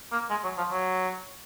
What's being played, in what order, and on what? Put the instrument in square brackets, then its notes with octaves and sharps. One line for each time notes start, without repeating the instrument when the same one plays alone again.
[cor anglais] A#3
G#3
F#3
F3
F#3